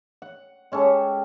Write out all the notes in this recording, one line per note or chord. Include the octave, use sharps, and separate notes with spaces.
F#5
G#3 C#4 G4 A4